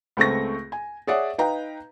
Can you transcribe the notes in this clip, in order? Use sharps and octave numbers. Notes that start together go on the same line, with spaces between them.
C#2 A3 C4 C#6 A#6
G#5
G#4 C#5 D5 E5 F#5
D#4 B4 F5 G5 A#5